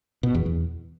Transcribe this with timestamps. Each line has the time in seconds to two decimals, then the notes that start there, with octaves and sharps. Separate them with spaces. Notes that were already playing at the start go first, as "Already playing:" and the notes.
0.23 B2
0.35 E2
0.46 E2